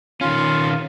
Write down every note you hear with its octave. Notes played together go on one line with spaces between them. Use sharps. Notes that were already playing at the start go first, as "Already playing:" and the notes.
D#3 C#4 F4 F5